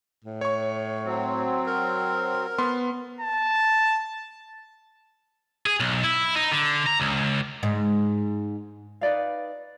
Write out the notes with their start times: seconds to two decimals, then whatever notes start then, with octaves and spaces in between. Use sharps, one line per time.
0.25 A2
0.41 C#5 C#6
1.05 F#3 C4
1.67 A#4
2.58 B3 C6
3.20 A5
5.66 G#4
5.80 B1
6.04 E4
6.36 D#4
6.52 D3
6.87 A#5
7.00 C#2
7.63 G#2
9.01 D#4 B4 D5 F5